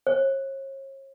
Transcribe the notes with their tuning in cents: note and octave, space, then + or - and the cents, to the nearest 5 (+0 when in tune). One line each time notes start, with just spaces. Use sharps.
C#5 -40